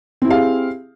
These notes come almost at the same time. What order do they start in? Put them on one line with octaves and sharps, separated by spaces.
C4 E4 G4 F5 G#4